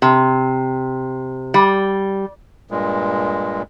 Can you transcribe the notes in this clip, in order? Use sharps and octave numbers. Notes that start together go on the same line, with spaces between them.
C3
G3
G2 A#2 G#3